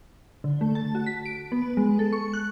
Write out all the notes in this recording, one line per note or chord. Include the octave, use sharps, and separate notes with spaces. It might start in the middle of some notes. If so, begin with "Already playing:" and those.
D3
A3
A5
F#4
B6
D7
B3
G#3
A4
C#6
F#6